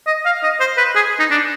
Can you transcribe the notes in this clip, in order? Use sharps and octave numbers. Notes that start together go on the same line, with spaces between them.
D#5
F5
D#5
C5
B4
G#4
D#4
D4